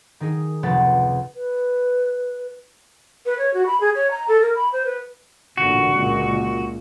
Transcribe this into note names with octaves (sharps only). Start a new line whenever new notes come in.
D#3 D#4 G#4
F1 C#2 C3 B4 F#5 A6
B4
B4
C#5
F#4
B5
G#4
C#5
A#5
A4
A#4
B5
C5
B4
A1 A#2 D3 F#4
C#2 A#2